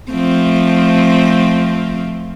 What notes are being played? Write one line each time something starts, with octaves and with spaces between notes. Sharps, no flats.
F3 A3 C4